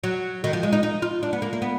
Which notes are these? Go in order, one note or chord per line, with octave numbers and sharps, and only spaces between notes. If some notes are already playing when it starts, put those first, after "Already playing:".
F#3
D#3
F3
G#3
D#4
D#4
F4
D4
B3
A#3
A#3
B3